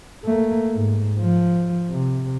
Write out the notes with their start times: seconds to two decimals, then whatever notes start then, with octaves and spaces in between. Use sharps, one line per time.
0.25 A3 A#3
0.74 G#2
1.21 F3
1.91 C3